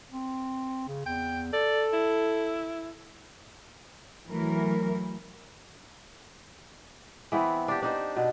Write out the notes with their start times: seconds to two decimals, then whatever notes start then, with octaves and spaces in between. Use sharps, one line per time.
0.11 C4
0.88 C#3
1.06 E2 G5
1.53 A4 D5
1.93 E4
4.27 E3 F#3 A3 A#4
7.32 E3 B3 C4 E4
7.68 D4 G4
7.82 D4 D#4 C5
8.16 B2